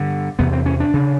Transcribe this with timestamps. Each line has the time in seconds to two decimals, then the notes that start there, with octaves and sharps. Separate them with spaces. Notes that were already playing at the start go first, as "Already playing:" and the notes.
Already playing: G2 D3
0.39 E2 C3 B3
0.53 C4
0.66 C#4
0.80 D4
0.94 C#3